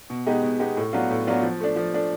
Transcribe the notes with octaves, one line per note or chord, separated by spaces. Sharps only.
B2
G#3 B3 D#4 G4
B2
G#3 B3 D#4 G4
A2
F#3 B3 D4 F4
A2
F#3 B3 D4 F4
F3
A3 D4
F3
A3 D4